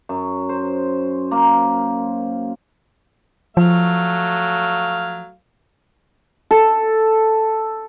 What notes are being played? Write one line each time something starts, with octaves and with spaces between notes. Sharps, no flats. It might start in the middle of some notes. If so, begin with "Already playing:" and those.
F#2
C5
A#3
F3 F#3 A3 F5
A4